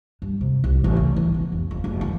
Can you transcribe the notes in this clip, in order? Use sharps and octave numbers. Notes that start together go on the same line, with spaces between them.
G2
C3
C2
A1
C#3
E3
B3
F1
F2
F#1
E3